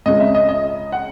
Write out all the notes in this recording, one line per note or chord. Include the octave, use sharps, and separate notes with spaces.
C#2 C#3 G#3 D#5
E5
D#5
D#5
F#5